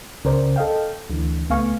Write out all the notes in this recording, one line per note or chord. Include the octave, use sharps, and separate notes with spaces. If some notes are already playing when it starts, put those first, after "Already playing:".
C#2 C#3 A#4 C5 D5
A4 D#5 F5 G5
D2 D3 E3
C#2 A3 B3 F5 G#5 C#6